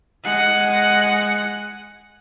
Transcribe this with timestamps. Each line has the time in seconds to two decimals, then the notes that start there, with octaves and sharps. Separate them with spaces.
0.23 G#3 F#5